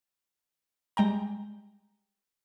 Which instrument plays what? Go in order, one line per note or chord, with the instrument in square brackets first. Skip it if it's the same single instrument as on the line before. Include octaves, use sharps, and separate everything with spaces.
[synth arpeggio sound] G3 G#3 G5 A#5